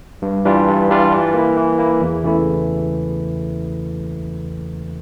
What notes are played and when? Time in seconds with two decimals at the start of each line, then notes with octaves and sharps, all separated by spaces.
0.22 G2
0.45 E3 G3 D4 F4
0.68 G2
0.90 E3 G3 D4 F4
1.12 E3
1.34 A#3 E4
1.57 E3
1.78 A#3 E4
2.01 E2
2.23 C#3 E3 A3 E4